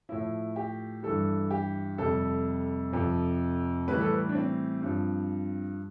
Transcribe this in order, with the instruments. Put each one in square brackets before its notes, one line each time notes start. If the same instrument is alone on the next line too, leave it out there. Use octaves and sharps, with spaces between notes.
[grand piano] A2 F3 E4
G4
G2 E3 G3 A4
G4
F2 C3 G3 A4
F2 C3 F3
A2 E3 G3 B4
A4
B4
D4
C4
G2 F3